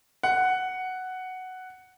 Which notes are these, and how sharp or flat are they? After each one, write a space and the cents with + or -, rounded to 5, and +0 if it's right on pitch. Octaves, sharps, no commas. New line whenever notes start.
F#5 +5